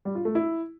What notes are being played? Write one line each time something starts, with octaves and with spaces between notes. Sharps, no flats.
G3
F4
A3
E4